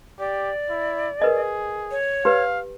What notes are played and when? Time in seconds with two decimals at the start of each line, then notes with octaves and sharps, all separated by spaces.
0.19 G4 D5
0.69 E4
1.22 G#4 A#4 B4 D#5
1.91 C#5
2.25 G4 B4 F5